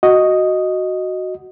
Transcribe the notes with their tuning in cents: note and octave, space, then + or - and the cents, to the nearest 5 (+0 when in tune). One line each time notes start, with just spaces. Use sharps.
F#4 +0 D#5 +0